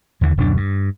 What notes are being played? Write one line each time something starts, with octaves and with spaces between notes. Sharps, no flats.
D#2 D3 E3
D1 F#2 B2 D4
G2